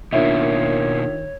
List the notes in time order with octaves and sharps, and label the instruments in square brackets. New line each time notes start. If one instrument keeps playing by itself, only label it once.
[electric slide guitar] B2 A#3 [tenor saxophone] D#3 [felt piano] D4 F4 E5 [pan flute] C#5